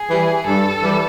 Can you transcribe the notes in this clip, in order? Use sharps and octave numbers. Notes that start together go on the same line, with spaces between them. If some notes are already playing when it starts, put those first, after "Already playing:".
Already playing: G#4
E3 G3
G2 A4
E3 G3